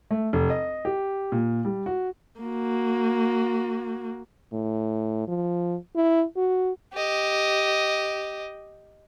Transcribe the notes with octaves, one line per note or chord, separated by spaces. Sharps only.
A3
F1
D#5
G4
A#2
G3
F#4
A#3 F#4
A2
F3
E4
F#4
G4 D#5